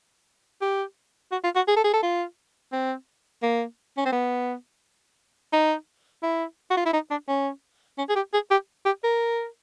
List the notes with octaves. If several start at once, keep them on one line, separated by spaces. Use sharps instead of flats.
G4
F#4
F4
F#4
G#4
A4
G#4
A4
F4
C4
A#3
C#4
C4
B3
D#4
E4
F#4
F4
E4
D#4
D4
C#4
C#4
G#4
G4
G#4
G4
G4
A#4